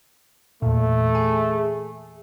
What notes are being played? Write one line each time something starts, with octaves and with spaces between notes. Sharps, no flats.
E2 A#2 A3
G#4